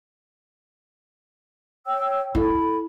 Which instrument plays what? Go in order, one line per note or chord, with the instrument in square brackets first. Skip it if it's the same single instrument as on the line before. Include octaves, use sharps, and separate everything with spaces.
[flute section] C#5 G5 E6
[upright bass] E4 [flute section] A4 B5